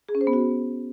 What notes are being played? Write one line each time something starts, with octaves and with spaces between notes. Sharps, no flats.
G#4
C#4
C5
B3
F#4